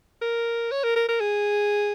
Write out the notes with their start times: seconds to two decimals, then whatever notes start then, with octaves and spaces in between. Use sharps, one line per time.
0.22 A#4
0.71 C#5
0.83 A#4
0.96 A#4
1.09 A#4
1.21 G#4